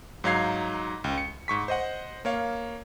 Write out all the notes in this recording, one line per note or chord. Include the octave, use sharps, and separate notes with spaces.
G#2 F#3 D#4 F5 G#6 C7
C#2
C#7
G#2 C#6 B6
C5 D#5 F#5
A#3 C#5 F5